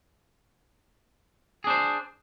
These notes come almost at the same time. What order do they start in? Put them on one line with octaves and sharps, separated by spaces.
G#4 D4 C5